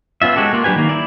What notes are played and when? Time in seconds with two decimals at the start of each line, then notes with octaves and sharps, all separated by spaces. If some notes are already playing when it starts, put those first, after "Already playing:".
0.22 B3 C#4 F4 E5
0.36 G#3 F#4 G4 A4
0.53 A#3 F4
0.64 F#3 D4 G4 B4 G#5
0.76 D#3 A#3
0.89 E4 D5